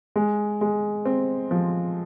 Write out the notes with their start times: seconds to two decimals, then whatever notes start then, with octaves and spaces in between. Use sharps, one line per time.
0.16 G#3
0.61 G#3
1.05 C4
1.51 F3